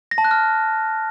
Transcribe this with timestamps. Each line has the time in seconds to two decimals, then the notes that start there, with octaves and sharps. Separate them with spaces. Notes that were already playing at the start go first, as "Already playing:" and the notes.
0.11 A#6
0.18 A5
0.25 F#6
0.31 F6